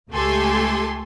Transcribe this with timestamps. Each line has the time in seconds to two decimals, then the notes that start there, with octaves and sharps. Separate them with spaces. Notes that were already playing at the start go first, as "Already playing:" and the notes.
0.11 C#2 A3 G4 A4 G#5 C6